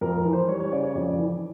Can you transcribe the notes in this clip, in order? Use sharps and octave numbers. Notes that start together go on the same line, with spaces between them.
F2 A#4
A#4
E3
C5
G3 C#5
C#5
C#3 D5
C#5
F2 D5
E3